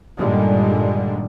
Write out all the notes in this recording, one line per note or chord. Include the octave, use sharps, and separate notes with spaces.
G2 A#2 D3 D#3 G3 G#3